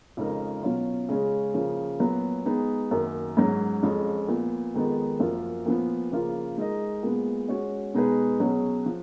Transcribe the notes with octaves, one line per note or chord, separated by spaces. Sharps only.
F2 C#3 G#3 D#4 A#4
B2 F#3 C#4 F4
C#3 G#3 C#4
C#3 F3 A#3
A#2 F#3 B3
G#3 B3 D#4 G#4
F#2 D#3 A#3
G#2 F#3 C#4
F2 F3 G#3 C#4
A#2 F3 B3
F2 D#3 G#3 B3 D#4
F#2 F3 A#3 F4
A#2 F3 B3
C#3 F3 A#3 F4
G#3 D#4 A#4 D#5
A#2 G#3 B3
G#3 C#4 F#4 C#5
B2 G#3 D#4 G#4 B4
B2 F#3 C#4 G#4
F3